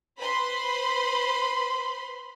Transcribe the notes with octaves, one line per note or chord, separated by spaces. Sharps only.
B4 C5 B5 C6